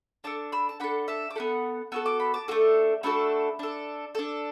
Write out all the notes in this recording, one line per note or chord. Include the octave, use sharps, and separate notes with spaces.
D4 A4 A5 D6
B5 E6
A5
D4 A4 F#5 B5
E5 A5
D6
B3 F#4 A4 F#5 B5
B3 F#4 A4 E6
D6
B5
A5 D6
A3 D4 F#4 A4
A3 D4 F#4 A4 B5 E6
D4 A4
D4 A4